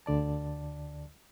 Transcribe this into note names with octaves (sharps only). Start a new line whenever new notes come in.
D2 D3 D5 A5